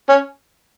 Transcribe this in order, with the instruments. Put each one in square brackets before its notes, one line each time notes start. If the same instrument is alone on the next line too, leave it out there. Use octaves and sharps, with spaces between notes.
[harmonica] C#4